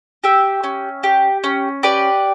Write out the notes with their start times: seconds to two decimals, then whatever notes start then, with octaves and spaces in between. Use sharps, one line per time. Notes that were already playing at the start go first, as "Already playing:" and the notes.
0.24 G4 E5 G5
0.64 C#4
1.03 G4
1.44 C#4
1.83 G4 B4 D5